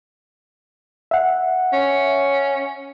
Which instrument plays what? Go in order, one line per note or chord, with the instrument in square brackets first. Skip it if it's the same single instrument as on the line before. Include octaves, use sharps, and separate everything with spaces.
[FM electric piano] E5 F#5
[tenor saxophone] C#4